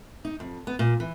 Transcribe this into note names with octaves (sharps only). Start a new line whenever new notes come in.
D#4
F2
B3
A#2
E3